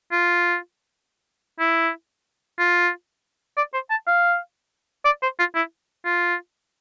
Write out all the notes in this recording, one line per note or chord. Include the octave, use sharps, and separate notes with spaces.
F4
E4
F4
D5
C5
A5
F5
D5
C5
F4
E4
F4